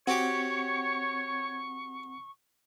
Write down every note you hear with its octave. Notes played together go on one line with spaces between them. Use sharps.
C4 F#4 G4 C#5 F#5 C#6